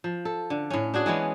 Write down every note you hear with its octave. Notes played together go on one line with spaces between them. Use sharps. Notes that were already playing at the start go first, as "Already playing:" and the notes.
F3
A4
D3
A2 C#4
D4 F#4 G#4
E3 G#3 B3 C#4